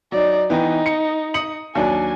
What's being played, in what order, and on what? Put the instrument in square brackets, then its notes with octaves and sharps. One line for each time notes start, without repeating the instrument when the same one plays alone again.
[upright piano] F#3 [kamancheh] D#4 D5
[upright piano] E3 B3 G5 [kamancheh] D#4
[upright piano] C#7
D#6 C#7 F#7
[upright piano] D#2 F#3 D4 [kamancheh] G#5